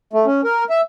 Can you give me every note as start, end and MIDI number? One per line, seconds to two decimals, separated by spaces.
0.13 0.26 57
0.26 0.41 61
0.44 0.64 70
0.70 0.81 76